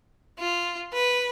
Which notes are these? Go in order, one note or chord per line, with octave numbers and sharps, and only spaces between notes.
F4
B4